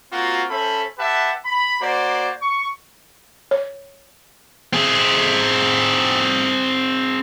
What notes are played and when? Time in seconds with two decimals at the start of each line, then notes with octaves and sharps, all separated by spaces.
0.12 A#3 C4 F4 F#4
0.50 C#4 A4 C5 E5 B5
0.99 G4 B4 E5 F#5 A5
1.45 B5
1.81 A#3 F#4 C5 D5
2.41 C#6
3.51 C#5
4.73 C4 G#4